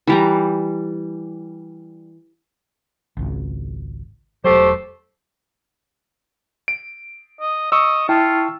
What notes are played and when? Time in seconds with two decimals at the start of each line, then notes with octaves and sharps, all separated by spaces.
0.07 E3 G3 A#5
3.17 G#1 C#2
4.44 E1 F#3 A3 G4 C5
6.68 D7
7.40 D#5
7.72 D#5 C#6 E6
8.09 E4 F4 G5 A5